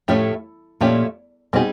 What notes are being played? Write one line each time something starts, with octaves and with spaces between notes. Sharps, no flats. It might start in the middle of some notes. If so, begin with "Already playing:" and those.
A2 F3 A3 C#4 E4 G4
A#2 F3 A3 C#4 E4 G4
B2 G3 C4 D#4 G#4